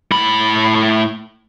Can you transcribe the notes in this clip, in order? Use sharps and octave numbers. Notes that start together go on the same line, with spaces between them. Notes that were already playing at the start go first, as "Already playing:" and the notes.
A2 B5